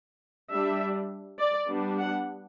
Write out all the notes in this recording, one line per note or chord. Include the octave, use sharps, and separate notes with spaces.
G3 D4 E5
D5
G3 B3 D4
F#5